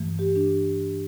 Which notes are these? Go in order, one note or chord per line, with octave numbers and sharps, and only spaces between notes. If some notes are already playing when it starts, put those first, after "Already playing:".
Already playing: G2 E3 A3
G4
D4